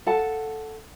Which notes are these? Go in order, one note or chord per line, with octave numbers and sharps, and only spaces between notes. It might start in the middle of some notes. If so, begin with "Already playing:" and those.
A4 F5 F#5 A5